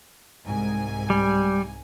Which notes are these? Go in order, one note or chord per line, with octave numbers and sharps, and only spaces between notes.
C2 G#2 G#5
G3